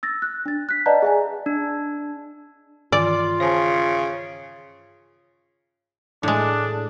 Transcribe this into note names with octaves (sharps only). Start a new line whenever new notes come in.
E6 A6 A#6
F#6
D4 A6
F#6 B6
B4 D5 D#5 F#5 A5 A#5
G#4 E5 G#5
D4
G2 D#3 E3 F4 D5
C#3 C5 G#5 A5
A2 G#3 D4